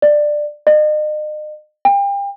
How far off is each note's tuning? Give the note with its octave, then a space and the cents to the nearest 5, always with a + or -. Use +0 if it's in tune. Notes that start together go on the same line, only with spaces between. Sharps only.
D5 +15
D#5 -40
G5 +35